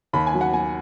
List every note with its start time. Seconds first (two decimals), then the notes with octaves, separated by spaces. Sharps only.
0.13 D#2 B5
0.27 G#5
0.34 F#3
0.41 F#5
0.53 F#3 G#5